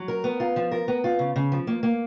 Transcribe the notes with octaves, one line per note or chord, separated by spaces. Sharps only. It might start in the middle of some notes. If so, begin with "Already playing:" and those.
Already playing: F#3
A#4
B3
F4
F3
A#4
B3
F4
C#3
C#3
F3
A#3
A#3